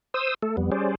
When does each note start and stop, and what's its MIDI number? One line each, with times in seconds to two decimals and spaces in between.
0.14 0.34 72
0.14 0.34 87
0.14 0.34 88
0.43 0.56 57
0.43 0.56 69
0.57 0.70 41
0.57 0.70 55
0.57 0.70 59
0.72 0.95 55
0.72 0.95 61
0.72 0.95 68
0.72 0.95 72
0.72 0.95 74